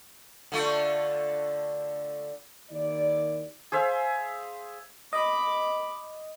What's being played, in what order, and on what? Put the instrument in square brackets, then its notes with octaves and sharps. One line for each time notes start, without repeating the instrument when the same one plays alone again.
[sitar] D3 A3 F4
[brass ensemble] D#2 D#3 E4 D5
[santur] G#4 C5 E5 F5
[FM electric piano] D#5 [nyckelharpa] B5 D6